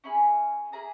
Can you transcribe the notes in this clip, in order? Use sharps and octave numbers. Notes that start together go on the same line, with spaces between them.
C#4 E4 G#4 B5
A#3 E4 G#4 A#5